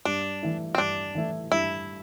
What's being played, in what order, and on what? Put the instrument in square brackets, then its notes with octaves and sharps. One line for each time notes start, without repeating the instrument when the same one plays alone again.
[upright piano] G2 [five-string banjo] D4
[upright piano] E3 A3 E4
[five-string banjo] C4
[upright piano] G2 [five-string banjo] D4
[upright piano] E3 A3 E4
[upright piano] G2 [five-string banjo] E4